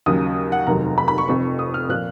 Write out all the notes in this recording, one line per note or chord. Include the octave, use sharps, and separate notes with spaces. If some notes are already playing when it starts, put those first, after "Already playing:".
D#2 C#3 F#3 D#6
F#5
F1 D#2 D#3 F#3 A#5
B5
B5
C#6
F1 F2 F3 C#6
D#6
F6
A#2 F3 F#6